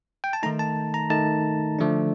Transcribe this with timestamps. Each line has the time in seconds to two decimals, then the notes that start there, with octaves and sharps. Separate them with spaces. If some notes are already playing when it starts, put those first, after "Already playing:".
0.24 G5
0.33 A5
0.43 D#3 A3 D#4 A#5
0.59 A5
0.94 A#5
1.10 D#3 A3 D#4 A5
1.79 D3 F3 A3 D4